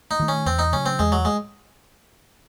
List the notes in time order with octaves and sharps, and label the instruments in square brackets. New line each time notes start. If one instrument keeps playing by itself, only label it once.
[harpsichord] D#4
[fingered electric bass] D#3 A3
[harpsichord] C#4
[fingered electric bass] E2 [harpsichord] C4
[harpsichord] D#4
[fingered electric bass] C#3 F#3 [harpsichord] C#4
[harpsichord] C4
[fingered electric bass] E2 [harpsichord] G#3
[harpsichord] F#3
G#3